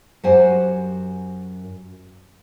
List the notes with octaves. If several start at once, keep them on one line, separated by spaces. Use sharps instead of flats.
F#2 F#4 G4 C5 F#5 G#5